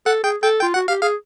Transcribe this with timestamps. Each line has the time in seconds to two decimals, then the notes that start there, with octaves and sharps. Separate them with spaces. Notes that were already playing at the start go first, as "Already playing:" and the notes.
0.06 A4 F#5
0.24 G#4 G5
0.43 A4 G5
0.61 F4 G5
0.74 F#4 F#5
0.88 G4 F5
1.02 G#4 F5